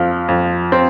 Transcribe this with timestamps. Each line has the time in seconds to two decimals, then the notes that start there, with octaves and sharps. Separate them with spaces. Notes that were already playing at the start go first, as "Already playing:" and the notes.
Already playing: F2 F3
0.28 F2
0.72 C4